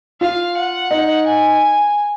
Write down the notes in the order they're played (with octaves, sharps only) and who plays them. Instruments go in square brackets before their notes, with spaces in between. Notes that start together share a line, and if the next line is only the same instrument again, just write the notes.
[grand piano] F4 [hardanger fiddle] F5
[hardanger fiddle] F#5
[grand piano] D#4
[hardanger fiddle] G#5